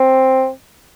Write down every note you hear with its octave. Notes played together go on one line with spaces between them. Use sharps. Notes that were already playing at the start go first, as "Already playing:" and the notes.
Already playing: C4